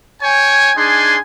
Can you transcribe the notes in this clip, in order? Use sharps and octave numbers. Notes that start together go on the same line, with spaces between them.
C#5 G5 G#5
D4 D#4 G#4 G#5 C6